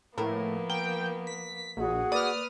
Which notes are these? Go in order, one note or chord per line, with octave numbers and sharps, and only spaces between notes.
A2 F3 A#3 B3 E4 A#4
A#4 G5
B6
A#1 F#4 G#4 F#5
A#3 B4 D5 D#6 F6